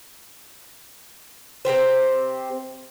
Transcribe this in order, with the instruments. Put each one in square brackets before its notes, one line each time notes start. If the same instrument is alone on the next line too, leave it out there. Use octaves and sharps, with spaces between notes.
[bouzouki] C3 C4 G4 C5